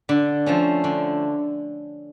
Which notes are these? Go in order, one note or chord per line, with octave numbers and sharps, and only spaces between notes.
D3
F3 A3 C#4
D3